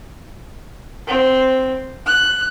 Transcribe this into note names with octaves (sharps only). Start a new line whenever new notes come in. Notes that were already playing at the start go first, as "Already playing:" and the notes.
C4
F#6